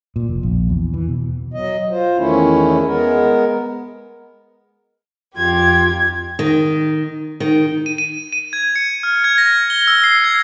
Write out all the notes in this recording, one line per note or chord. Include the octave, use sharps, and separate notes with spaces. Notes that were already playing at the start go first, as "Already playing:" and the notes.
A#2
F1
A#1
E2
E3
B2
F#3 D#5
F4 C5
E2 D#3 A3 C#4 E4
G#3 B3 A#4
F2 F4 G4 G#6
D#3
D#3
D#7
D#7
D#7
G#6
C#7
F6
G#6
A#6
G7
E6
C7
G#6